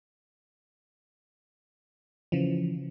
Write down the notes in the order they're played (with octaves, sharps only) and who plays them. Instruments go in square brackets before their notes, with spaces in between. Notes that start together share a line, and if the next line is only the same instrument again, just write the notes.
[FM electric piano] C#3 E3 F3